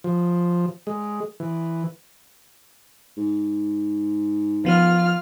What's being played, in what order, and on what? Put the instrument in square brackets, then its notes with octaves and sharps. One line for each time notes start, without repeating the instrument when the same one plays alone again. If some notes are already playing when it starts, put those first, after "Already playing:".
[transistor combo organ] F3
G#3
E3
[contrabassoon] G#2
[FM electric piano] F3 B3 [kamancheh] F4 F6